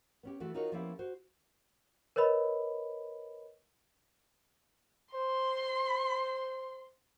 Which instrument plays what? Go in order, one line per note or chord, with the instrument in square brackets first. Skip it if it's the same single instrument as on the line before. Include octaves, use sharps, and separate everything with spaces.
[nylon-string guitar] B3 C#4 G4
E3 A3 F#4
D#4 F4 F#4 G#4 A#4 C#5
F3 A#3 B3 C#4 E4 G4
F#4 C5
[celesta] A#4 B4 C#5 D#5 B5
[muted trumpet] C5 [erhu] C6